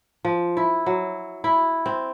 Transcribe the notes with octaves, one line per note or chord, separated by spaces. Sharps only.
F3
E4
F#3
E4
C4